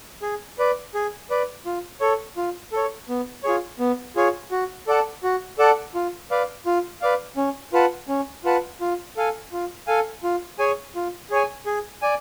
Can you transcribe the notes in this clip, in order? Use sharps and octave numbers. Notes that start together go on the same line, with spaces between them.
G#4
B4 D5
G#4
B4 D5
F4
A4 C#5
F4
A4 C#5
B3
F4 G#4 C#5
B3
F4 G#4 C#5
F#4
A4 D5 F#5 A5
F#4
A4 D5 F#5 A5
F4
B4 D5 F5
F4
B4 D5 F5
C#4
F4 B4 F#5 A5
C#4
F4 B4 F#5 A5
F4
A4 F5 G#5
F4
A4 F5 G#5
F4
G#4 C#5 G#5
F4
G#4 C#5 G#5
G#4
D5 G#5